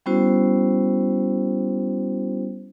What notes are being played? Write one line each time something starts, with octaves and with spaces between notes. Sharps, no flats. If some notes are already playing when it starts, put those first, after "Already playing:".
G3 B3 C#4 E4 F#4 C5